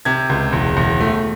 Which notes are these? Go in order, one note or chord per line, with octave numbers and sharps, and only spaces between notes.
C3 G#6
C#2
E1
E1
A3